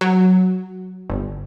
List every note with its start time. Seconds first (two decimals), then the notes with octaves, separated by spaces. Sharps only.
0.01 F#3
1.10 G1